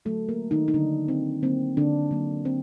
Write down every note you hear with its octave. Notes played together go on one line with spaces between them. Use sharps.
D3 F#3 A3 A4
A#3 A#4
D#3 D#4
D#4
D3 F#3 A3 D4
C4
D3 F#3 A#3 C4
D3 D4
D3 F#3 A#3
C4